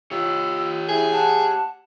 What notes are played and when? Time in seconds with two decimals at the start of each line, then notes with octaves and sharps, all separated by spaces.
0.11 F4 G4 C#5 E6
0.89 E4 G#4
1.12 F#5 A5